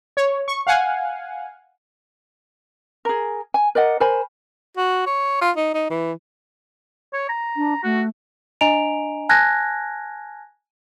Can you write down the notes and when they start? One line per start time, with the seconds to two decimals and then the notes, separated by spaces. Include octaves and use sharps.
0.17 C#5
0.48 C#6
0.67 F5 F#5 G#5
3.05 G#4 A#4
3.54 G#5
3.75 A#4 D5 D#5 F#5
4.00 A#4 C5 G#5 B5
4.77 F#4
5.07 C#5
5.41 F4
5.56 D#4
5.74 D#4
5.90 E3
7.14 C#5
7.29 A#5
7.56 D4
7.83 A3 F#4
8.61 D4 D#5 G#5 A#5 D7 F7
9.29 G#5 A5 F6 F#6 G#6 A#6